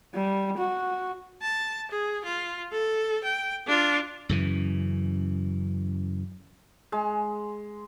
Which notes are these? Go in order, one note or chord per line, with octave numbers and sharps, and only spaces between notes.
G3
F#4
A5
G#4
F4
A4
G5
D4 F4
F#2 C#3 E3
G#3